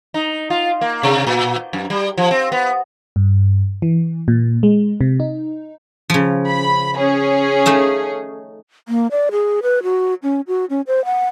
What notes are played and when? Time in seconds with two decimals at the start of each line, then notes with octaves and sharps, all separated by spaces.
0.14 D#4
0.50 F4
0.81 A#3
1.03 C3
1.27 A#2
1.73 F#2
1.90 G3
2.18 F3
2.31 C4
2.52 B3
3.16 G2
3.82 E3
4.28 A#2
4.63 G#3
5.01 C3
5.20 D#4
6.10 C#3 F3
6.48 B5
6.97 C#4 G#4
7.66 A3 D#4 F5
8.88 A#3
9.11 D5
9.31 G#4
9.63 B4
9.83 F#4
10.23 C#4
10.47 F#4
10.70 C#4
10.87 C5
11.05 F#5